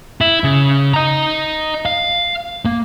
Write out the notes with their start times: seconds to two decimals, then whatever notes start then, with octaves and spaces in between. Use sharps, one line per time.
0.21 E4
0.44 C#3
0.93 D#5 A#5
1.85 F5
2.65 A#3